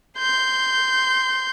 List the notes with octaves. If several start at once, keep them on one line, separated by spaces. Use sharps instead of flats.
C6 G6